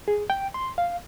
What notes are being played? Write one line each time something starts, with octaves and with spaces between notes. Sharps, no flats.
G#4
G5
C6
F5